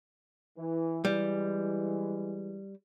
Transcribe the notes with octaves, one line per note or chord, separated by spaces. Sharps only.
E3
E3 G3 G#3